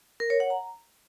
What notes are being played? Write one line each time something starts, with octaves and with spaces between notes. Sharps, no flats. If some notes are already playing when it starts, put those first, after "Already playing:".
A#4
C#5
F#5
A#5